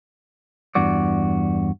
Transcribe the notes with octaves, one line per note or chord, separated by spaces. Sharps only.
E2 G2 F#4 D5